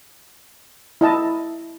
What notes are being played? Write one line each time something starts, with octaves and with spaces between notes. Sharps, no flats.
E4 D#5 A5